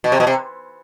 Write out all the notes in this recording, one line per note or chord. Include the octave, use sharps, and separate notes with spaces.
B2
C3
B2
C3